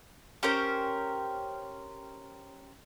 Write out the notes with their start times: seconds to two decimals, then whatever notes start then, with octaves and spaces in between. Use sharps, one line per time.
0.43 C#4 G4 A#4 C5